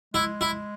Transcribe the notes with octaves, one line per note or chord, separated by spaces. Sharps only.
G#3 E4
E4